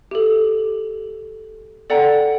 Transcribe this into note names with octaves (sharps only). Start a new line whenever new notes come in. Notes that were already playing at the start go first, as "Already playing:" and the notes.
G4 A4
A4 D5 F#5 G5 A#5